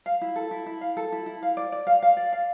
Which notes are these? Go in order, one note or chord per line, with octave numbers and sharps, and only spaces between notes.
F5
E4
A4
E4
E4
F5
A4
E4
E4
F5
D5
D5
F5
F5
D5
F5